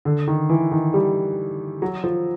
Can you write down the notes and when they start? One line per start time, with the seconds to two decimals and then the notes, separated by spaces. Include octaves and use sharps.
0.05 D3
0.27 D#3
0.49 E3
0.72 D#3
0.94 G3
1.82 F#3
2.04 F3